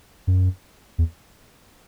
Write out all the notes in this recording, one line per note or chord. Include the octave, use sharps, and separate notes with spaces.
F#2
E2